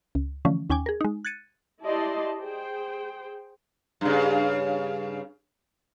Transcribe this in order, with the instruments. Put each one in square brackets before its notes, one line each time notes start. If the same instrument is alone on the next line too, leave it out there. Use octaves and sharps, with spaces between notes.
[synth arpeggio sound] C#2
D3 E3 F3 A3 C#4
D#2 C#4 G5 G#5 D6
G#4 A#4
G#3 D#4
F#6 G#6 A6 C#7 D#7
[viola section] E4 G4 D5 D#5 A5 C6
G#4 C5 G5
[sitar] G2 C#3